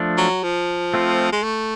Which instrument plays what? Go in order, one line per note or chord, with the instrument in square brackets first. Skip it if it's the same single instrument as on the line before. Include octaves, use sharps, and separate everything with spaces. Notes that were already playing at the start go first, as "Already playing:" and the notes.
Already playing: [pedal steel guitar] F3 A3 D4
[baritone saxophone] F#3
F3
[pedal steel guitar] A3 C4 F4
[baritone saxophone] G#3
A3